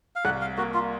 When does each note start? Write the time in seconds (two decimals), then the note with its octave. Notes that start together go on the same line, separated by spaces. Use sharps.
0.16 F5
0.25 C2 F#5
0.41 F5
0.58 A#3 F#4
0.74 F4